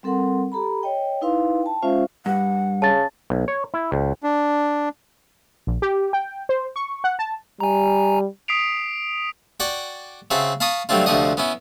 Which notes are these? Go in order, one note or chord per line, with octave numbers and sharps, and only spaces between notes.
G3 C4 A4 A#4 F#5 C6
G4 A4 A#5 B5
C#5 D#5 G5
D#4 E4 B4 F5 C6
G5 A5
G#3 C#4 F4 C5 E5 F5
G2 F#5
C#3 A5 A6
B1
C#5
E4
C#2
D4
A#1
G4
G5
C5
C#6
F#5
A5
G3 G#5 A#5
D#6 B6 C7 D7 F7
F#4 D5 F#5 G5
C#3 C4 F#4 E5 A5
F5 A5 B5 C#6 D#6
F#3 G3 A3 C4 D4 F4
D2 C3 F3 D4 F#4 D#5
B3 C#4 E4